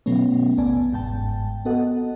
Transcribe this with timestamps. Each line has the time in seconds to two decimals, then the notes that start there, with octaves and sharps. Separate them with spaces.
0.06 B2 F#3 A3 B3 C#4
0.57 A1 D#2 B3 D5 G#5 A5
0.92 G1 G#2 G5 A5
1.65 B3 F#4 A4 D#5 F#5